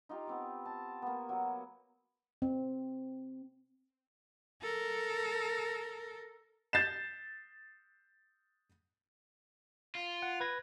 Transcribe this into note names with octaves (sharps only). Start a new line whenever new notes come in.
D#4 F4 G4 F5
B3 C4 D6
A5
A#3 B3
F#3 F#4
C4
A4 A#4
G6 A6 C7 E7
F4
F#5
B4 G#6 A#6